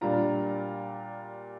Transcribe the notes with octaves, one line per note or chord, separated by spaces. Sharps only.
A#2 G3 D4 F4 A#5